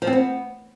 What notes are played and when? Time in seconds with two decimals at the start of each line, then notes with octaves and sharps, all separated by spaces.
0.02 F3
0.07 C4
0.13 B3